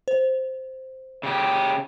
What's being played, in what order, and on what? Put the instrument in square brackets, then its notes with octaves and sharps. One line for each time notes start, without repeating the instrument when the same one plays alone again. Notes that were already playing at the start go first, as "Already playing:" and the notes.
[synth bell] C5
[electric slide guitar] C#3 G4